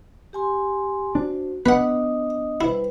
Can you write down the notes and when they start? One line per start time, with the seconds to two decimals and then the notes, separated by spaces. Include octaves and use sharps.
0.33 G4 G#5 C6
1.15 D4 F#4 C5
1.66 B3 D4 B4 D#5 F#5 D#6
2.61 G3 E4 B4 C5